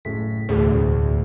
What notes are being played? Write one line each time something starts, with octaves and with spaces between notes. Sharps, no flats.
F#1 A2 G#4 B6
E1 D2 A2 G#4